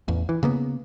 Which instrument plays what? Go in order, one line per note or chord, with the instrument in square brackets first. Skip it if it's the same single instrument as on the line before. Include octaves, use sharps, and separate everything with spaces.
[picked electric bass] A1 E2
E3
C#3 A#3 B3